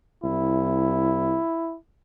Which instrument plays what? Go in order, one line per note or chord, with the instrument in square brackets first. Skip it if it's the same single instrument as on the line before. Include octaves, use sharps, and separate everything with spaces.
[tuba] C2 [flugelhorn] E4